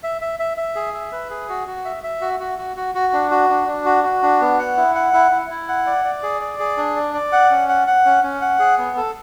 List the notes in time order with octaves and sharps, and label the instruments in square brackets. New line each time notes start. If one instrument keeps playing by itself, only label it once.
[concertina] E5
E5
E5
E5
G#4
E5
B4
G#4
F#4
F#4
E5
E5
F#4
F#4
F#4
F#4
F#4
D4
F#4
D4
D4
F#4
F#4
D4
B3
F#5
E4
F#5
E4
E4
E4
F#5
D5
D5
G#4
D5
G#4
D4
D5
D5
F#5
C#4
F#5
F#5
C#4
C#4
F#5
G#4
B3
A4